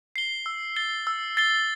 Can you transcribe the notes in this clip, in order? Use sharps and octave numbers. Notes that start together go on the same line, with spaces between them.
C7 G7
E6
A6 C7 G7
E6
A6 C7 G7